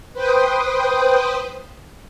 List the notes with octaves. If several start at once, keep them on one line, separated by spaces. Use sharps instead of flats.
B4 C5 G5 D#6